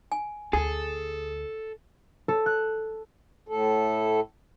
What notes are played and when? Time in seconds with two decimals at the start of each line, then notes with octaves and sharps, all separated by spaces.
0.12 G#5
0.53 D2 G#4 A4
2.28 A4
2.46 F#6
3.48 A2 A4